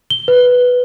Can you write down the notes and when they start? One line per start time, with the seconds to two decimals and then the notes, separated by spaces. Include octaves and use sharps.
0.10 G7
0.28 B4